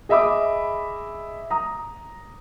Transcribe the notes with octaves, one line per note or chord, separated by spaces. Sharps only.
G#4 D#5 E5 B5 D6 D#6
A#5 D#6